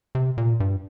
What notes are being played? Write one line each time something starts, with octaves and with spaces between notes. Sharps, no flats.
C3
A#2
G2